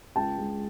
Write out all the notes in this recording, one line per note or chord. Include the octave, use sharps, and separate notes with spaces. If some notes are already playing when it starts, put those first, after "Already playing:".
C#2 G5 A5
G#3